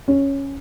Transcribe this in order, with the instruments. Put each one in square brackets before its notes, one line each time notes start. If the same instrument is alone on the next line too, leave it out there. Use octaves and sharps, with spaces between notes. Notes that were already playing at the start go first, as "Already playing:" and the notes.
[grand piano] C#4